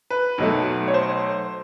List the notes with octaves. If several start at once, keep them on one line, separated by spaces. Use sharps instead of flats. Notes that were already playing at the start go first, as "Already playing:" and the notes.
B4
B1 B2 F#3 A3
C#5
C5